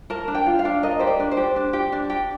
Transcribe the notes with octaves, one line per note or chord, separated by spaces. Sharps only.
A#4 A5
D4
G5
F4
F5
D4
A#4 D#5
G4 C5
D5
D4
C5
G4
D4
G4
D4
G4